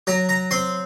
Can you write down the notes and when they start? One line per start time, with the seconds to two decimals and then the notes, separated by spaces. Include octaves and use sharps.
0.07 F#3 A#5
0.29 A#5
0.51 C4 C6